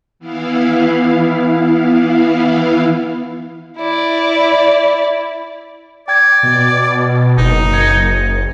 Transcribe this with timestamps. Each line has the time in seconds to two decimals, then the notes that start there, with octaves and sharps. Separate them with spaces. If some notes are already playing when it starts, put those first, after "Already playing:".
0.19 E3 B3 E4 F5
3.78 E4 D5
6.08 D5 G5 G#6
6.43 B2
7.38 F#1 D#4
7.74 G#6 C#7